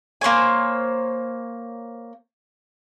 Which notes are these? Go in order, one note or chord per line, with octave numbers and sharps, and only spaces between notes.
A#3 C5 C#5 G#5